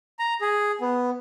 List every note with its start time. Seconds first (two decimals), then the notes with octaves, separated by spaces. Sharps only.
0.19 A#5
0.41 G#4
0.81 B3